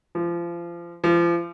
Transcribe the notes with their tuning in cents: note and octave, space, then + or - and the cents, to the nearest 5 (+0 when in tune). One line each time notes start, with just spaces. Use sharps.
F3 -30
F3 -35